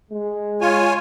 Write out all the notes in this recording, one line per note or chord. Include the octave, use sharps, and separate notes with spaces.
G#3
F4 C#5 G#5